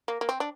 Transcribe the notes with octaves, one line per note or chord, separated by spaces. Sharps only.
A#3
A#3
C4
D4